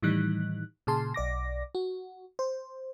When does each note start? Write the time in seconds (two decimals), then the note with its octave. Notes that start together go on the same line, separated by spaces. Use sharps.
0.02 A2 D#3 E3 G3 D#4 F#6
0.87 A#2 C#3 G#4 A5 C6
1.14 B1 D5 D6 A#6
1.75 F#4
2.39 C5